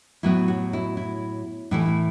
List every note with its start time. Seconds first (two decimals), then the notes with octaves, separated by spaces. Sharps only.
0.23 A2 F#3 B3 E4
0.48 F#4
0.73 E4
0.97 E4
1.71 A2 E3 A3 E4
1.86 E4